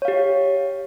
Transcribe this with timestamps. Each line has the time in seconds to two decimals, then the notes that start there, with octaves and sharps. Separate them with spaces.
0.02 C#5
0.05 F5
0.08 G4